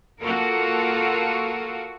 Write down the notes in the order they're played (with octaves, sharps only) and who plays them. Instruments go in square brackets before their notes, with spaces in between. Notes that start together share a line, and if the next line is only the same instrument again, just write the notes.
[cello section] A#3 F4 F#4 A4 A#4